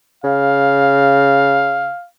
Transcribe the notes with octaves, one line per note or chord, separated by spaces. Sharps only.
C#3 F5